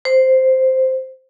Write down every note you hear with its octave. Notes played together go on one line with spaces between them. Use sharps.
C5